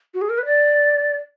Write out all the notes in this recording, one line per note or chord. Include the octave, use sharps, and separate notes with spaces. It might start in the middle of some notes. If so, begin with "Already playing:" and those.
F#4
G#4
A#4
B4
D5